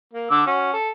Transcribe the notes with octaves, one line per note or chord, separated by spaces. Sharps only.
A#3
D3 D6 E6
C#4 F#4
A4